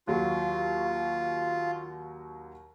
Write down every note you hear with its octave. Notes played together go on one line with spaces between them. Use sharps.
D#2 F#3 F4